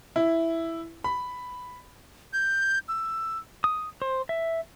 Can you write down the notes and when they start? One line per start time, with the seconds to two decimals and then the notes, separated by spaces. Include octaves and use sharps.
0.16 E4
1.04 B5
2.33 G6
2.88 E6
3.64 D#6
4.02 C5
4.29 E5